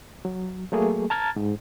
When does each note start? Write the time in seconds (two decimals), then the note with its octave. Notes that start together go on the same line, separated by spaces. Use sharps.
0.25 F#3
0.72 F#3 A3 A#3 G#4
1.10 A5 A#5 F6 G#6 A6
1.36 G#2